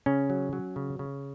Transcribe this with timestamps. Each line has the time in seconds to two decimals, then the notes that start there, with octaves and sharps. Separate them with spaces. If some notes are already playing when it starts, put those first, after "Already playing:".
0.06 C#3 C#4
0.30 F#3
0.53 F#3
0.76 C#3
0.99 C#3